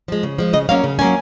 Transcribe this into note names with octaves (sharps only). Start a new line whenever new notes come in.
F3 G#3
C#3
F3 G#3
C#3 D#5
F#3 A#3 C#4 F5
C#3
F#3 A#3 C#4 G#5